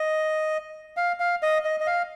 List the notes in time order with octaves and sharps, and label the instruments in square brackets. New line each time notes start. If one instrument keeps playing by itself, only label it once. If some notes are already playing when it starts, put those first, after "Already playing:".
Already playing: [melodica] D#5
F5
F5
D#5
D#5
D#5
F5